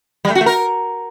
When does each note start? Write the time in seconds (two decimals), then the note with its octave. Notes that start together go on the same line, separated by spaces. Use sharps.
0.25 G3
0.30 A3
0.35 F#4
0.41 A3
0.46 A#4